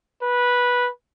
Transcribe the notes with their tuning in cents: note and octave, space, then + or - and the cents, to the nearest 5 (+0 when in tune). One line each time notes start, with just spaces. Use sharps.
B4 -10